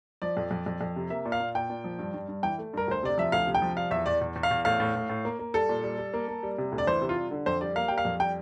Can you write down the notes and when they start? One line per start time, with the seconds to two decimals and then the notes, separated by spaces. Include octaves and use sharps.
0.22 F3 D5
0.37 F2
0.51 F2
0.66 F2
0.81 F2
0.96 C3
1.10 A#3 E5
1.25 A#2
1.32 F5
1.40 A#2
1.55 A#2 G5
1.70 A#2
1.84 F3
1.99 G2
2.14 G2
2.29 G2
2.43 E3 G5
2.58 A3
2.73 G2 A#4
2.88 D2 C5
3.03 C3 D5
3.18 F3 E5
3.32 D2 F5
3.47 C3
3.55 G5
3.62 F3
3.76 G3 F5
3.91 E2 E5
4.06 E2 D5
4.21 E2
4.36 E2
4.43 F5
4.51 E2
4.65 A2 F5
4.80 A2
4.95 A2
5.09 A2
5.25 A#3
5.39 A#3
5.54 G3 A4
5.69 A#2
5.84 G3
5.98 G3
6.14 A#3
6.28 A#3
6.43 G3
6.58 C3
6.72 D2
6.78 D5
6.87 E3 C5
7.01 C3
7.09 F4
7.17 G3
7.31 D3
7.46 F2 C5
7.61 G3 D5
7.76 A#3 F5
7.88 G3 G5
7.98 F5
8.05 F2
8.20 G3 G5